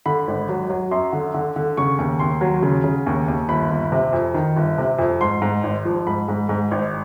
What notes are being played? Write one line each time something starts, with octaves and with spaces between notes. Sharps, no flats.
D3 B5
G#1
F#3
F#3
F#2 C6
D3
D3
D3
C#3 C#6
D#2
D#2 C6
F#3
C#3
C#3
D#2
D#2
G1 B5
G1
C3
F2
D#3
G1
C3
F2
G#2 C6
G#2
G#1
F3
G#2 B5
G#2
G#2
G#1